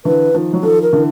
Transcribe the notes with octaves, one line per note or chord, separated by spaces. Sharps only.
D3 E3 B4
D#3 F3
F#3
D#3 F3 A4
A#4
D3 E3